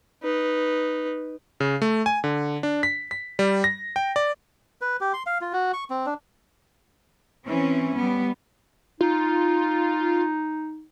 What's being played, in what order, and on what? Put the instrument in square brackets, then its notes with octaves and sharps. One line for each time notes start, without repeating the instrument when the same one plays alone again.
[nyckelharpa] D#4 B4
[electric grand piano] C#3
A3
G#5
D3
D4
B6
B6
G3
A#6
G5
D5
[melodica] B4
G4
C6
F5
F4
F#4
C#6
C4
D4
[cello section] E3 C4 C#4
G3 B3
[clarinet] D#4 [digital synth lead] F4